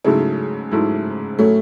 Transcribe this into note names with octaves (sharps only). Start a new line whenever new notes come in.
G#2 C#3 F#3 A3 E4
G#2 F#3 A3 E4
A2 F#3 A3 C#4